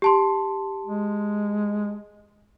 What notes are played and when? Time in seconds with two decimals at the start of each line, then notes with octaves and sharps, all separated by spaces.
0.02 G4 A5 C6
0.86 G#3